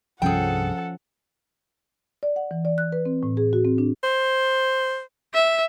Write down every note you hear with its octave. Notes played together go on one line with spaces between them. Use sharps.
C2 G2 F3 C#4 G#4 A4 F#5 G5
D5
F#5
E3
D5
F#6
B4
C4
A2
G#4
F#4
C4
D4
C5
E5